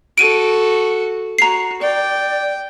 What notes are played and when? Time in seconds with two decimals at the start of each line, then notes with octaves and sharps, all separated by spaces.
0.18 F#4 A4 D7 D#7
1.39 F#4 A#5 C7
1.81 D5 G5